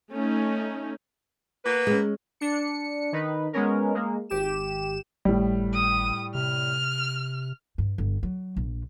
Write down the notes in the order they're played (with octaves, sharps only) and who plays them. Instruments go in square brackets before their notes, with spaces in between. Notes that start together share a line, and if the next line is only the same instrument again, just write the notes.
[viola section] A3 C#4 D#4
[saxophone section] A#3 B3 B4
[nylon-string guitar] G#3 C#4
[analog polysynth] D4 C#7
D#3 D#4 B4
G#3 B3 C#4 A#4
G#3 A#3
G#1 G4 E7
[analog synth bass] G#1 [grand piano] A2 G3
[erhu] D#6
[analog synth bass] C3 [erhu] F6
[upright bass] G2
G1
F#3
A#1